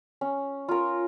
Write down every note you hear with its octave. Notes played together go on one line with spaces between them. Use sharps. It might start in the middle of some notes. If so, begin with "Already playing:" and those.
C#4
F4 A#4